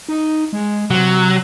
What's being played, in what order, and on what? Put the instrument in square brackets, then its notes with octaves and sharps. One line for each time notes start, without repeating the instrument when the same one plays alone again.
[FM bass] D#4
G#3
[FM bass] C3 [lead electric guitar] F#3